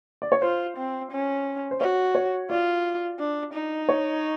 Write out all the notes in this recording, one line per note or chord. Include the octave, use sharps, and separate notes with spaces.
D5
C#5
F4 C5
C4
C#4
C5
F#4 C#5
C#5
F4 D5
D4
D#4
C#5